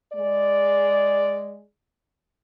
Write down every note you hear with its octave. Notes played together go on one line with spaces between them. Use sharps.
G#3 D5